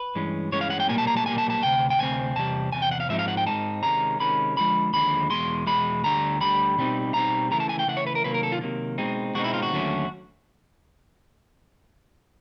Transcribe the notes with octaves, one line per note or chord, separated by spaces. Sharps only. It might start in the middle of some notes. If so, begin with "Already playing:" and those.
Already playing: B4
G2 E3 G#3 C#4
G2 E3 G#3 C#4 C#5
F5
F#5
G5
B1 A#2 G3 A#3 G#5
A5
A#5
A5
B1 A#2 G3 A#3 G#5
A5
A5
D2 C3 G5
G5
D2 C3 C4 G#5
E2 C3 G3 A5
E2 C3 G#5
G5
F#5
F5
G#2 F3 G#3 C4 D#4 E5
F5
F#5
G5
G#2 F3 G#3 C4 D#4 A5
C3 D#3 G#3 C#4 A#5
C3 D#3 G#3 C#4 B5
D#2 D3 F3 G#3 B5
D#2 D3 F3 G#3 B5
E2 B2 G#3 C6
E2 B2 G#3 B5
D2 D3 G3 A#5
D2 D3 G3 B5
B2 G3 C4 D#4
B2 G3 C4 D#4 A#5
C#3 E3 A3 A#5
A5
G#5
G5
C#3 E3 A3 F#5
C#5
B4
A#4
C3 D#3 F#3 A#3 B4
A#4
A4
F4
C3 D#3 F#3 A#3
B2 G#3 C4 D#4
B2 G#3 C4 D#4 F#4
E4
F4
F#4
D#2 D3 F#3 A3 C#4